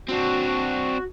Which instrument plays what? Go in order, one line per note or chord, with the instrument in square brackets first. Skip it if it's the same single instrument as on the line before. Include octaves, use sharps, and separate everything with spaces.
[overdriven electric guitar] C4 D4 [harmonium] F#4